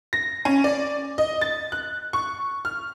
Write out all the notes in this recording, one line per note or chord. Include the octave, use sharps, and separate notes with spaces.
A#6
C#4
D5
D#5
A6
F#6
C#6
F6